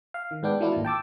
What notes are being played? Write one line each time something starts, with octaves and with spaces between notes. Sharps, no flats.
F5
D#3
G#2 B3 D4 G5
E3 F#3 A3 D4 E4 F4
G#1 A#2
G5 A5 D6 E6